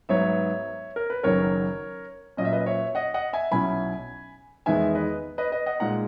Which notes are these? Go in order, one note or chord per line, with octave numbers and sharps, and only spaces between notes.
G#2 F#3 B3 C#5 E5
A#4
B4
F#1 F#2 D#3 F#3 C#4 A#4 C#5
A#2 F#3 C#4 D#5
E5
B4 D#5
C#5 E5
D#5 F#5
D#5 F#5
E5 G#5
B1 B2 F#3 C#4 E4 G#5 B5
E2 D#3 G#3 B3 D#4 E5 G#5
B4 D#5
B4 D#5
B4 D#5
D#5 F#5
A#2 G#3 D#4 F#5 A#5